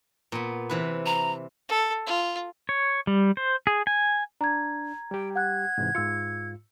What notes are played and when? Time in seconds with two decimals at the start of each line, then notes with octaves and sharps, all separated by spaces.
0.32 A#2 B3
0.69 C3 E3 B4
1.06 A#5
1.69 A4
2.07 F4
2.69 C#5
3.07 G3
3.37 C5
3.67 G#4
3.87 G#5
4.41 D4 A#5 G#6
5.11 G3 G4 G5
5.36 F#5 F#6 G#6
5.78 G#2 C3 E3
5.95 G#2 F4 E6 C#7